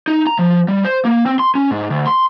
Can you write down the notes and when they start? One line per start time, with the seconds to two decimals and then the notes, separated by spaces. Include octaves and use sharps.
0.08 D#4
0.27 A#5
0.39 F3
0.68 G3
0.85 C5
1.05 A#3
1.26 C4
1.39 C6
1.55 C#4
1.71 G#2
1.90 D2
2.07 C6